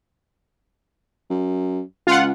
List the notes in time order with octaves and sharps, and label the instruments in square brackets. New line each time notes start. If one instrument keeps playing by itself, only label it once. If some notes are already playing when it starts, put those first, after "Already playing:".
[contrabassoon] F#2
[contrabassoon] C#2 [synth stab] F4 F#5